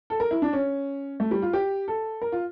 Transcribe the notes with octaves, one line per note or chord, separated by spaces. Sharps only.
A4
A#4
E4
D4
C#4
A3
G3
F4
G4
A4
A#4
F4